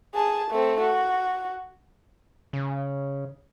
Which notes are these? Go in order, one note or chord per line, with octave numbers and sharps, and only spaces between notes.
G#4 A5
A3 C4
F#4
C#3